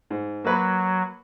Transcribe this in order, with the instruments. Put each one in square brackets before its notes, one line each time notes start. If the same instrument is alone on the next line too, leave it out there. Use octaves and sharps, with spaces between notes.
[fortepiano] G#2
[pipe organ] F#3 [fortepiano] A#3 B4